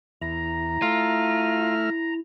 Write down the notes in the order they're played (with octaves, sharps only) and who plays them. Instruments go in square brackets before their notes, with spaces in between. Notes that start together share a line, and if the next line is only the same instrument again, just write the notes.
[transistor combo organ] E2 [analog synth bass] E4 [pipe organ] A#5
[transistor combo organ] A3 E5 F6 [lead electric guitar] F4